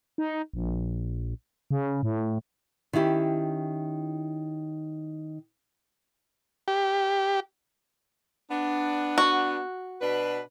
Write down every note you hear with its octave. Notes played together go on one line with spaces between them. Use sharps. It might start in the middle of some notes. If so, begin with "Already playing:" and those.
D#4
A#1
C#3
A2
D#3 C#4 E4 G4
G4
B3 D4
F#4
B2 D4 B4